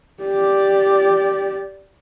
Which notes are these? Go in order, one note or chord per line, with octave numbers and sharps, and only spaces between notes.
G4 D5